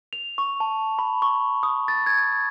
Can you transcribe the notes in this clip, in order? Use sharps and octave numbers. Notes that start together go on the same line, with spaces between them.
F7
C#6
A5
B5
C#6
D#6
A6
G#6